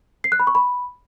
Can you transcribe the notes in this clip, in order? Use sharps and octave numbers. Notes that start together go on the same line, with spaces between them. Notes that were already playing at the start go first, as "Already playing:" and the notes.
C7
F#6
B5
C#6
B5